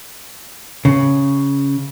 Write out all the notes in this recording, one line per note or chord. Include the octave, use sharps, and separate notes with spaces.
C#3